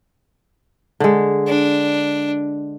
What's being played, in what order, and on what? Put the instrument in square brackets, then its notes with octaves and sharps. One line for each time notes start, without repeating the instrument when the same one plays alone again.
[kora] D3 G#3
[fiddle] D4